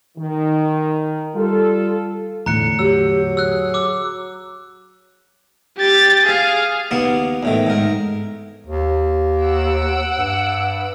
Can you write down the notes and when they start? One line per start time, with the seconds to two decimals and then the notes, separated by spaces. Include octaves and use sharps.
0.18 D#3
1.35 G3 F4 A4
2.46 E2 A2 D3 A#5 F#6 C#7
2.79 F#3 G4 E6
3.37 G#4 E6 F#6
3.74 D6 E6
5.78 G4 A6
6.25 G#4 F5
6.91 D#2 A#3 B3 F#5
7.43 E2 A2 D#3
7.67 G#2 A#4
8.67 D#2
9.39 F#5 E6 D7
10.18 G2